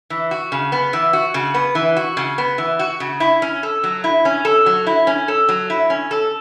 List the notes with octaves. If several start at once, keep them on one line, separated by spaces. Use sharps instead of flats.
E3
F#4
C#3
B3
E3
F#4
C#3
B3
E3
F#4
C#3
B3
E3
F#4
C#3
E4
C#4
A4
F#3
E4
C#4
A4
F#3
E4
C#4
A4
F#3
E4
C#4
A4